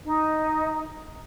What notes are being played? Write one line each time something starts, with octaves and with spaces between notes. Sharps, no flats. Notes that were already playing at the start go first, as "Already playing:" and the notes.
D#4